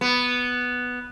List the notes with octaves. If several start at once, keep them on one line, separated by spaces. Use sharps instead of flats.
B3